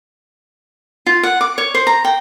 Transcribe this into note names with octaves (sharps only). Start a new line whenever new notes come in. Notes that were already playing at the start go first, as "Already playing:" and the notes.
F4
F#5
D6
C#5
C5
A#5
G5